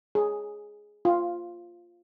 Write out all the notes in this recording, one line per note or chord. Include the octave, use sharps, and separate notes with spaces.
G#4
F4